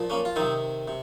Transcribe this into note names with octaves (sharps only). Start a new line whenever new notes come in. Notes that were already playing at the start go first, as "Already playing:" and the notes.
Already playing: A#2 F3
A#3 C#4
F4
C3 D#3 C4 D#4
C3